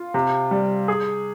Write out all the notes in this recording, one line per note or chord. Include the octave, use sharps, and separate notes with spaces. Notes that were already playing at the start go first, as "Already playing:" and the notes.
Already playing: F4
C3
G3
G#4